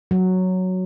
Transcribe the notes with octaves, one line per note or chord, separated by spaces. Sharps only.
F#3